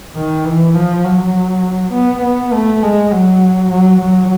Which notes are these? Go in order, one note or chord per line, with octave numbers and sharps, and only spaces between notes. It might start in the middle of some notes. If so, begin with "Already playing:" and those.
D#3
E3
F3
F#3
B3
B3
A3
G#3
F#3
F#3
F#3